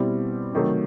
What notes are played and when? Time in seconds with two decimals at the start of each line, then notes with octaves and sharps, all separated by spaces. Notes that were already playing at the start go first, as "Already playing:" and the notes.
Already playing: B2 G3 C4 E4
0.53 C3 D#3 F#3 A3